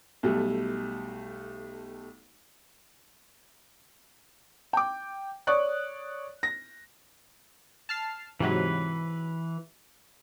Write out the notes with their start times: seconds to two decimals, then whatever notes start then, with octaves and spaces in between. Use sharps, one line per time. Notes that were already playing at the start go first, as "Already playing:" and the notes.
0.23 B1 G3 A3
4.73 G5 D6
5.47 C#5 D5 C#6 D#6 F#6
6.43 A#6
7.89 A5 F6 C7
8.40 G#2 C3 E3 F#3 B4